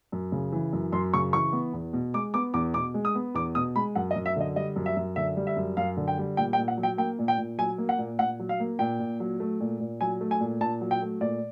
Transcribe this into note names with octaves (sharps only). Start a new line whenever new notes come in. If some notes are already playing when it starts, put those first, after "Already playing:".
F#2
C#3
E3
F#2
F#2 C6
C#3 C#6
E3 C#6
B3
E2
B2
G#3 D6
B3 D6
E2 D6
B2 D6
G#3
D#6
B3
E2 D6
B2 D#6
G#3 B5
F#2 F#5
D#5
F#2
E5
D3 D#5
G3 D#5
F#2
E5
F#2
D3 E5
G3
E5
F#2
F#2 F5
D3
G5
G3
A#2 G5
G5
A#2
F#5
F#3
G5
A#3 G5
A#2
G5
A#2
F#3 G#5
A#3
F#5
A#2
A#2 F#5
F#3
F5
A#3
A#2 G5
A#2
F#3
A3
A#2
A#2
F#3 G#5
A3
G#5
A#2
A#2 A5
F#3
G5
A3
A#2 D5